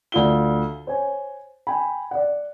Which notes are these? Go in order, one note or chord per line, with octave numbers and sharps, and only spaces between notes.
D2 F4 G7
C5 C#5 G#5
G5 G#5 B5
D5 F#5